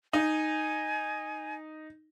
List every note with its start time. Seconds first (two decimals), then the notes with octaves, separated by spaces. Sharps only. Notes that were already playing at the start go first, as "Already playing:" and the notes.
0.13 D#4 G#5